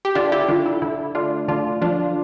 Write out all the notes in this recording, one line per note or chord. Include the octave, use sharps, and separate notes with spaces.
G4
D3 D4 F4
E4 G4
D3 D4 F4
E4
D3 E4
A3 D4 F4
D3 D4 F4
F3 D4 F4